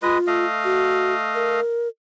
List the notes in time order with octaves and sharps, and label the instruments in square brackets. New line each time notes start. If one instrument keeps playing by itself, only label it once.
[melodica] G#3 B4 D#5 [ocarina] F4
[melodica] A3 D#5 F5
[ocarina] F#4
A#4